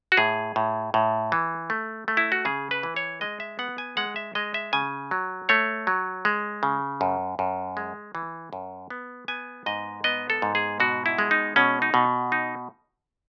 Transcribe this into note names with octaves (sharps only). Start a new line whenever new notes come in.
F#4
A2 G#4
A2
A2
E3
A3
A3
E4
F#4
C#3 G#4
B4
E3
C#5
G#3 D#5
E5
B3 F#5
G#5
G#3 F#5
E5
G#3 D#5
E5
C#3 G#5
F#3
A3 C#5
F#3
G#3
C#3
F#2
F#2
G#3
E3
F#2
B3
B3 G#5
G#2 D#5
B3 D#5
A4
G#2
G#4
B2 F#4
E4
G#3
D#4
B2 C#4
D#4
B2
D#4